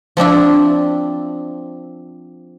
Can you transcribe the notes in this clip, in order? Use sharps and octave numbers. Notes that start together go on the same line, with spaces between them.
F3 C4 D4 E4